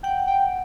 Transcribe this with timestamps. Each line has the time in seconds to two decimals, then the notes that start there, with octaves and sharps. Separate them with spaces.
0.03 F#5 G5
0.27 G5